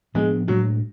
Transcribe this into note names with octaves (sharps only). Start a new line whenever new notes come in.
A2 F3 G#3 B3 D4
A2 F#3 G#3 D4